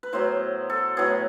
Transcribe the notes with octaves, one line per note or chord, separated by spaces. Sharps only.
B4
A2 F#3 B3 C5
A4
A2 F#3 B3 G#4